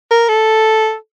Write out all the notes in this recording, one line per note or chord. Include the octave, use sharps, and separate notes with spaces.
A#4
A4